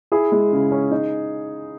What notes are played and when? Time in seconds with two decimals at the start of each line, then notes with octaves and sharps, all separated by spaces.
0.12 E4 G#4
0.32 G#3
0.52 C#3
0.72 C#4
0.91 D#4